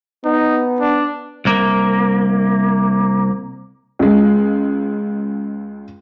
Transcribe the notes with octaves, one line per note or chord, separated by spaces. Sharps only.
B3 D#4
D4
C2 A#3
C#2 G#3